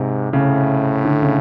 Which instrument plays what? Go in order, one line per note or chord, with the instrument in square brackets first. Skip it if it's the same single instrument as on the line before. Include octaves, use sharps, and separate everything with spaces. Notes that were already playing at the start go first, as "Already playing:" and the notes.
Already playing: [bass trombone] G#2 [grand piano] C3
[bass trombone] A2 [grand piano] C#3
[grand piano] D3
C#3